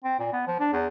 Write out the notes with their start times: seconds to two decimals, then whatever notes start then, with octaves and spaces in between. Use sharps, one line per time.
0.04 C4
0.19 A#2
0.33 B3
0.47 F3
0.60 D4
0.73 E2